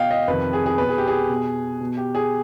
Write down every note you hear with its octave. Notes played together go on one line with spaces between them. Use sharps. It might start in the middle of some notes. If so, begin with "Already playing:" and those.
Already playing: B2 D#5 F5 G5
D#5
F2 C3 D#3 B4
G#4
G#4
B2 B4
G#4
G4
G#4
B2
B2
G4
G#4